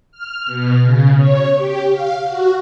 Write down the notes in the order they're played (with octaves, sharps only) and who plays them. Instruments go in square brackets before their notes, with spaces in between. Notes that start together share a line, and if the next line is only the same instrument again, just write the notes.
[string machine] F6
B2
C#3
C#5
G4
F5
F#4